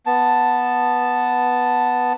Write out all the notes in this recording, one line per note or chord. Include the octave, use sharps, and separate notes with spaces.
B3 A5